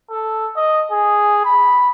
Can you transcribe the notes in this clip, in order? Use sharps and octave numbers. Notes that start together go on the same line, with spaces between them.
A4
D#5
G#4
B5